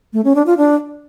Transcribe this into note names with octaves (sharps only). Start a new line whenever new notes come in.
A3
C#4
D4
F4
D4